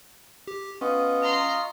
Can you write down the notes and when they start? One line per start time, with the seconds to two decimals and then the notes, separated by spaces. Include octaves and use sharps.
0.48 G4
0.81 B3 C#4 F4 D#5 C#6
1.22 A#5 C6